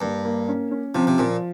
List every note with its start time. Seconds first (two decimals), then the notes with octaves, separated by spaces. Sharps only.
0.01 G2 A#3
0.25 A#3
0.48 C#4
0.71 C#4
0.94 C3 F3
1.07 C3
1.18 A#2 F3